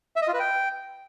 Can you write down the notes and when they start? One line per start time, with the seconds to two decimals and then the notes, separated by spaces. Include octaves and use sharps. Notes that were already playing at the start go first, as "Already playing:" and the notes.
0.16 E5
0.22 D#5
0.28 F4
0.34 B4
0.39 G5